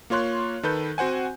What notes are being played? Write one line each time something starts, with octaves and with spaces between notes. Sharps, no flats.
A#3 F4 C#5 C6 F#6
D#3 A4 B4 G6
C4 F#4 C5 F#5 G#5